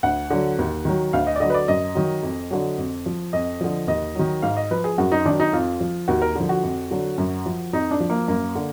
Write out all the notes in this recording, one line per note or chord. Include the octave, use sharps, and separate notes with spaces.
D2 F#5
D3 F#3
D#2
D#3 F#3
D2 F5
D#5
D5
D3 F#3 D#5
B4
D5
F#2 D#5
D#3 F#3
F2
D3 F#3
F2
F3
F2 D#5
D3 F3
D#2 D#5
D#3 F#3
G#2 F5
D#5
F3 B4
G#4
F#2 F#4
D#4
D#3 F#3 D4
D#4
F2 F4
F3
D#2 F#4
A#4
D3 F3
F#4
F2
D3 F#3
F#2
F3
F2 D#4
D4
F3
A#3
F#2 A#3
D3